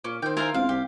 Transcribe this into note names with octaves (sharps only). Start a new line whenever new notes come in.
A#2 C#4 D6
D#3 C4 G5
E4 F4 A#4 C5 G#5 G#6
E1 C4 F5
C2 G4